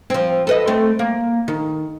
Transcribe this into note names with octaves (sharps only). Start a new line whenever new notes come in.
F3 C4
A4 B4 D#5
A3 C4
A#3
D#3